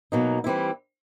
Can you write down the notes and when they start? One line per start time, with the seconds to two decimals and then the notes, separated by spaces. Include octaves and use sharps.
0.12 B2 F#3 A#3 D#4
0.44 E3 G3 C4 E4